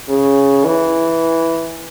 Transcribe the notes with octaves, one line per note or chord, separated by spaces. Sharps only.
C#3
E3